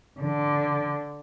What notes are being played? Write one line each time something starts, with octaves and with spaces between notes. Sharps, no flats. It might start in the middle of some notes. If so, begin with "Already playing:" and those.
D3